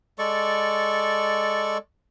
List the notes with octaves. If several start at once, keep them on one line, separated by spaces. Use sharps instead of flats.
G#3 A4 D5 C#6